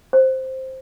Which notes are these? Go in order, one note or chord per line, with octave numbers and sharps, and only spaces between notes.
C5